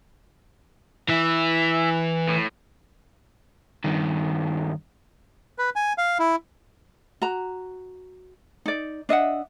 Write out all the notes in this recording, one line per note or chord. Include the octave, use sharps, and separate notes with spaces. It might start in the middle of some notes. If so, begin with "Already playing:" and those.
E3 E5
A2
G2 D#3
B4
G#5
F5
E4
F#4 A#5
D#4 D5
D4 D#5 E5 F#5